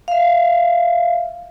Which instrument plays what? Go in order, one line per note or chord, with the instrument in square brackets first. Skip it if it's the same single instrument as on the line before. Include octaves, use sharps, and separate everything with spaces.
[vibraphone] E5 F5